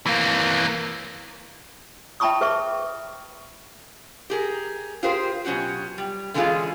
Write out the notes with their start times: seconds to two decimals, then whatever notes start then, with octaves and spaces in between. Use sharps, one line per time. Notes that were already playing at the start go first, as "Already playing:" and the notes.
0.06 E3 A#3
2.20 E5 G5 A5 B5 C#6 D#6
2.41 G#4 B4 E5 C#6
4.30 G4 G#4 A#4
5.03 F4 G4 G#4 A#4 C5
5.45 B2 F#3 C#4 F#4 G4
5.98 G3
6.34 D3 E3 G#3 C#4 F4 G#4